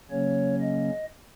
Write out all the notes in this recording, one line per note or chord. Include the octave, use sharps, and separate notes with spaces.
C#3 F#3 A#3 C#4 C#5
D#5